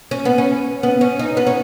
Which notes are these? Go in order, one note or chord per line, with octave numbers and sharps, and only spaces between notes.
C#4
B3
C#4
B3
C#4
D#4
B3
C#4